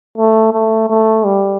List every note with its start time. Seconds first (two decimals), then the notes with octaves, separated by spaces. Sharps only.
0.18 A3
0.53 A3
0.89 A3
1.25 G3